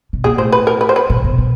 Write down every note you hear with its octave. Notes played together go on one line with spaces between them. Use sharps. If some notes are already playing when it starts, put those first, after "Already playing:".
B2
A#2 G#4
A2 C5
B4
A#4
B4
C5
B4
A#2
B2
B2